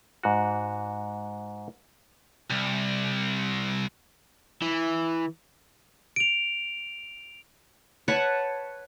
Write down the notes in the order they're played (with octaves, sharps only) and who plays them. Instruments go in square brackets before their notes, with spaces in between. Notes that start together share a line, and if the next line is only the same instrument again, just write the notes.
[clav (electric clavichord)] G#2 F#4
[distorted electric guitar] C2
[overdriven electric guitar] E3
[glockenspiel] D7 F7
[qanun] B4 C#5 F#5 A5